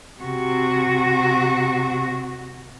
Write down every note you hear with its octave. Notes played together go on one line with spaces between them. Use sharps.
C3 F#4